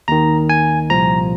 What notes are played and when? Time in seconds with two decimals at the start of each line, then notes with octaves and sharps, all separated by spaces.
0.08 D#2 D#3 A#5
0.49 G#5
0.90 C2 A#2 F3 A#5